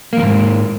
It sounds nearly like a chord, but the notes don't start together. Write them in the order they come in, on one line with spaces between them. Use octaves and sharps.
A#3 E2 G#2